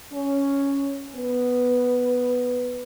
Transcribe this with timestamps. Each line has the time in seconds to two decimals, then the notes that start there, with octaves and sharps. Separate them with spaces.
0.14 C#4
1.15 B3 B4